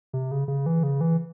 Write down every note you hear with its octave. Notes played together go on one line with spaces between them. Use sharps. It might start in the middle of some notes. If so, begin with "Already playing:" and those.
C3
C#3
C#3
E3
C#3
E3